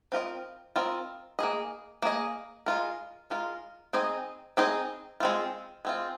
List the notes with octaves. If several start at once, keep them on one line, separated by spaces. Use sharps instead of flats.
C4 F4 A#4 D#5
C4 F4 A#4 D#5
A#3 G#4 D#5
A#3 G#4 D#5
G#3 F4 A#4
G#3 F4 A#4
C4 D#4 G#4 D#5
C4 D#4 G#4 D#5
G#3 C4 F4
G#3 C4 F4